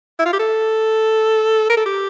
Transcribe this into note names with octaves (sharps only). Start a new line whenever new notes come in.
E4
F4
G4
A4
A#4
A4
G4